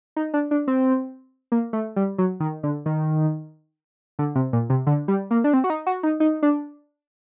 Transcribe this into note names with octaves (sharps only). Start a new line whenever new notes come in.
D#4
D4
D4
C4
A#3
A3
G3
F#3
D#3
D3
D#3
D3
C3
A#2
C3
D3
G3
A#3
D4
C4
F#4
D#4
F#4
D#4
D#4
D4